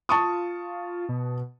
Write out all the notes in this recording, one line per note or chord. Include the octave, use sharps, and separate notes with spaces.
F4 A5 C#6 D#6
B2